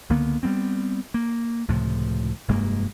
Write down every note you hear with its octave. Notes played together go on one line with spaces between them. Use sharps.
C#2 D3 A#3 B3
G3 A3 B3 C4
A#3
C#2 A2 C3 F3
F1 G2 G#3 A#3